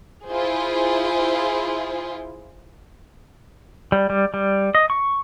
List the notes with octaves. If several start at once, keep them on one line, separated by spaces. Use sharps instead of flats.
E4 F4 G#4 C5
G3
G3
G3
D#5
C#6